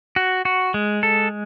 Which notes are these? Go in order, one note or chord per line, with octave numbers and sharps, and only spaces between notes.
F#4
F#4
G#3
A4